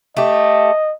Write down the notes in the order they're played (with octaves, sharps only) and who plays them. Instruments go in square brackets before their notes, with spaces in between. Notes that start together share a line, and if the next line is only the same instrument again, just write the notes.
[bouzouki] A3 G4 [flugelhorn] D#5